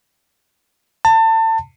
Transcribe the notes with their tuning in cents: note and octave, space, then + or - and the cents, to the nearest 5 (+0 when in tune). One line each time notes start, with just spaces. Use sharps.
A5 +30